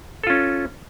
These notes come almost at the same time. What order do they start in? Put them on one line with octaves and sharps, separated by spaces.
A4 F4 C#4